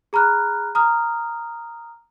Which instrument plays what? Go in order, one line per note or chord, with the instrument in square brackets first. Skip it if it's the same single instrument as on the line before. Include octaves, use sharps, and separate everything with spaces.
[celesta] G#4 A#5 B5 F6 F#6
A#5 D#6 F6